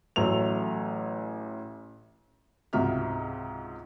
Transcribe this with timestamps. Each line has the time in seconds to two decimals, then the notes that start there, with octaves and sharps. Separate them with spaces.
0.16 A1 F#3 A3 F7
2.73 C#2 G#2 C3 F#4 E5 F6